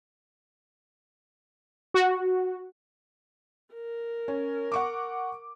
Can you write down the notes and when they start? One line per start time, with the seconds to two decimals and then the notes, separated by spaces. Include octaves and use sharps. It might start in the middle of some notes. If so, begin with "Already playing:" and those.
1.94 F#4
3.74 A#4
4.28 C#4
4.72 F#5 C#6 D6